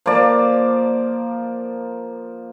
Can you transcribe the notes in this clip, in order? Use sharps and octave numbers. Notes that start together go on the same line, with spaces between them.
F3 A#3 D5